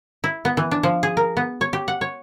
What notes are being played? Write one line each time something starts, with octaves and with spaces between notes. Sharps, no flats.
E4
B3
E3
D4
F3
G#4
A#4
B3
C#5
G4
F#5
C#5